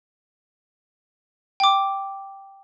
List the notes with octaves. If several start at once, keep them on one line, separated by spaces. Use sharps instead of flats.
G5 D6